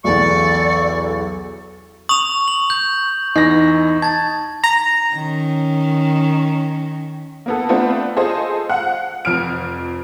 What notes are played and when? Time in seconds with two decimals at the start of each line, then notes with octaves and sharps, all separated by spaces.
0.04 B1 E2 A4 D5 C#6
2.09 C#6 D#6 F7
2.48 F#7
2.70 G6
3.36 E2 E3 D#4 D#5 A#6
4.02 A5 G#6 A6
4.64 A#5
5.15 D#3 C#4
7.46 A#3 B3 A4
7.69 A3 B3 C4 D4 F4 B4
8.16 F4 G#4 A4 C5 D#5
8.70 F5 F#5
9.25 F1 F2 F6 D7